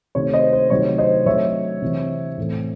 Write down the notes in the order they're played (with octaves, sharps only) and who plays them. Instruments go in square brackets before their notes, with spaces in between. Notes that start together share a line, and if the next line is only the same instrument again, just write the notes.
[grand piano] C3 D#3 A3 C4 C#5
C5 D#5
C5
C3 D#3 F#3 A3 C4 C#5
C5 D#5
C3 F#3 A3 C#5 E5
C3 E3 C4
A2 E3 A3 C4